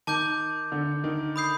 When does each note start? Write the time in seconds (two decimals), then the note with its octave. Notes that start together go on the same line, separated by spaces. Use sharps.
0.07 D#3 A5 D6 G6
0.72 D3
1.04 D#3
1.36 B5 D#6 G6 C7